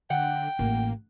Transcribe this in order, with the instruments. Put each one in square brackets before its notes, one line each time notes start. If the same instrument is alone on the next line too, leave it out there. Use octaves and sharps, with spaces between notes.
[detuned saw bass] D3 [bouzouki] F#5 [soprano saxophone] G5
[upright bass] A1 [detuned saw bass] A#3